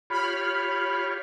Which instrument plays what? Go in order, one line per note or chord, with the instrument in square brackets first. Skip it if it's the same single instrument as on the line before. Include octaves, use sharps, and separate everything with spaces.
[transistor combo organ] F4 G4 C#5 [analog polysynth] B5 F6